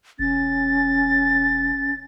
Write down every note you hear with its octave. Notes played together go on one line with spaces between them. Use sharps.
E1 C#4 A6